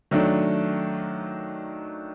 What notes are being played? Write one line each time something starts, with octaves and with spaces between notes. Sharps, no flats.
D#3 F#3 A3 D4